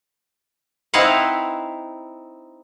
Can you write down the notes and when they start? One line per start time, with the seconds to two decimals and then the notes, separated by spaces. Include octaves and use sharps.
0.94 C4 D#4 E4 B4 F5 F#5